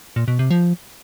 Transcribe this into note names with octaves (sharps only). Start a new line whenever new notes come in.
A#2
B2
C3
F3